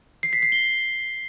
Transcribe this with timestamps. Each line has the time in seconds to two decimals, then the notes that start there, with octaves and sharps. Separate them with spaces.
0.23 C7
0.33 B6
0.42 C7
0.52 G7